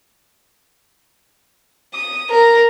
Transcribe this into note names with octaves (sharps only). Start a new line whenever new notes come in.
D#6
A#4